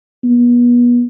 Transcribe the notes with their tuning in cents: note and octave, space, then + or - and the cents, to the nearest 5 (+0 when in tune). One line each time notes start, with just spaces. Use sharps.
B3 -35